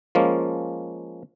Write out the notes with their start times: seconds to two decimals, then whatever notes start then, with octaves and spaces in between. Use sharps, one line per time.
0.15 F3 G#3 A#3 C#4